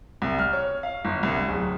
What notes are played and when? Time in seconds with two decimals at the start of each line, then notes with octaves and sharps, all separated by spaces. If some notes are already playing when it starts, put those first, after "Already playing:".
0.22 C2
0.39 F6
0.53 C#5
0.83 F5
1.05 G1
1.23 C2
1.49 D1